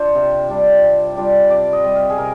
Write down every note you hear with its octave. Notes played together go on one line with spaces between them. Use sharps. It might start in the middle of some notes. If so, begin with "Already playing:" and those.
Already playing: D4 F4 C5
C3
G3 D4 F4
C3
G3 D4 F4
C3 D5
D#5
G3 C4
F5
G#4
C3 A#4